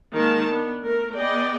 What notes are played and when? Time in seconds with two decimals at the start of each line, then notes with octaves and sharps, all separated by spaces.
0.14 D#3 G#3 A#3 A5
0.50 B3 D4
0.82 A3 A#4
1.16 B3 G#4 D5 D#5 G5